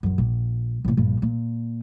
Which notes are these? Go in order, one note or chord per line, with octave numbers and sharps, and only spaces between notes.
A1 F#2
A#1
A1 A#2
A#1 G2
A#2